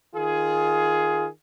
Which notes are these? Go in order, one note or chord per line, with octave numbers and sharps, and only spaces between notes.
D#3 F4 G#4